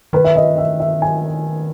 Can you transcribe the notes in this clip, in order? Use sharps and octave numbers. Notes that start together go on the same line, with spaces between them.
D#3 B4
E5
D#5
E5
E5
G#5